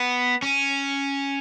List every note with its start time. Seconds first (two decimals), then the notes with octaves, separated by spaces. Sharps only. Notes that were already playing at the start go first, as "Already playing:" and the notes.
Already playing: B3
0.42 C#4